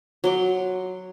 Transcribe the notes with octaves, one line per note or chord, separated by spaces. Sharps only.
F#3 C6 D6